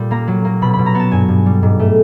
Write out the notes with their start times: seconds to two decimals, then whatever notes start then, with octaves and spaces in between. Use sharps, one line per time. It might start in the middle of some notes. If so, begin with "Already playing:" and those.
Already playing: A#2 G3
0.11 A#3 A#5
0.27 F#3
0.45 A#3
0.62 B2 B5
0.73 B5
0.79 B2
0.86 A#5
0.95 B3 A5
1.11 G2 G#5
1.29 G2
1.46 G3
1.63 G#2
1.79 A3